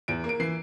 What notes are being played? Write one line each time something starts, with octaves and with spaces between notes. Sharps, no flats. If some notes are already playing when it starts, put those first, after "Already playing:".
E2 D7
A#3
D7
E3 C7